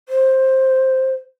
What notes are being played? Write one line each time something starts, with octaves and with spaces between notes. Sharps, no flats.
C5